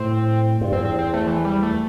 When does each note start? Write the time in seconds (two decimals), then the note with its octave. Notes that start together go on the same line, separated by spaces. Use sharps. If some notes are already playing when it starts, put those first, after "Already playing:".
Already playing: A2 C4
0.61 G2
0.72 E2 C4
0.85 C4
0.99 C4
1.14 A3
1.27 E3
1.45 G3
1.63 A3